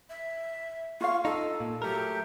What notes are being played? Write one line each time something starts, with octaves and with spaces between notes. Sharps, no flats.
E5
F4 F5 C#6
D#4 A4
A#2
F#3 A3 G4 A#4